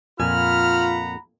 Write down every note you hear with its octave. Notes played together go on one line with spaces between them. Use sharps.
F2 A#2 F4 F#5 G#5 A#5 B5 F6